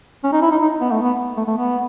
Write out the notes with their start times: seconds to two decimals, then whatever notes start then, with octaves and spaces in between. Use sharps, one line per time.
0.24 C#4
0.33 D#4
0.42 E4
0.51 D#4
0.62 D#4
0.81 B3
0.92 A3
1.02 B3
1.37 A3
1.47 A3
1.57 B3